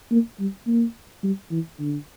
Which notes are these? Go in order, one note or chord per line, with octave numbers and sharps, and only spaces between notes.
A#3
G3
A#3
G3
E3
D3